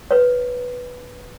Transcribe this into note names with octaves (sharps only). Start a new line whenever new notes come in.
B4 C#5